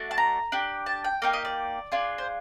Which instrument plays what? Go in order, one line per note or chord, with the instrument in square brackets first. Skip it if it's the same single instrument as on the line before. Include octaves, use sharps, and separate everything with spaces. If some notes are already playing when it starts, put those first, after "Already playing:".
Already playing: [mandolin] A3 D4 F#4
A5
A#5
D4 G4
A5
G5
A#3 D#4 G4 F5
D#5
D5
D4 F4 G#4
C5